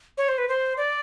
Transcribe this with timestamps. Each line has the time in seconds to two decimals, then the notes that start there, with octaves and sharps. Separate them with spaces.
0.18 C#5
0.29 C5
0.38 B4
0.48 C5
0.77 D5